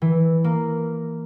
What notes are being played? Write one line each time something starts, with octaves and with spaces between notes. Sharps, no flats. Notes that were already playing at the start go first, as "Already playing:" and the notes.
E3
A#3